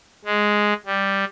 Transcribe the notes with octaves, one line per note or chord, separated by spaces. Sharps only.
G#3
G3